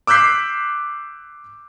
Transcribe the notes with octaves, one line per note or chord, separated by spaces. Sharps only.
D6 E6 F#6 G6 B6 C7